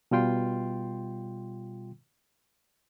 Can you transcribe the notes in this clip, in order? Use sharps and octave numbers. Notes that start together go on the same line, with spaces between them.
B2 G3 F4 G5 C6